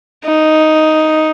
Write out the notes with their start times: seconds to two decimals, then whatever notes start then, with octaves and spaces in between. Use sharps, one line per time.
0.25 D#4